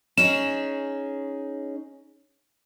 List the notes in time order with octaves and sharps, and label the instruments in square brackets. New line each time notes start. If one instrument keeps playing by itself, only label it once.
[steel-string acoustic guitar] C#4 D#4 G#4 [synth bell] E7